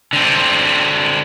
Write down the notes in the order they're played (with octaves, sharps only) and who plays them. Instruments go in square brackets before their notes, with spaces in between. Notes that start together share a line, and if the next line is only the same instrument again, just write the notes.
[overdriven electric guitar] D3 C4